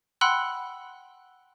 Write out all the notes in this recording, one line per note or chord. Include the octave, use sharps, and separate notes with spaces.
F#5 G5 B5 C6 E6 F#6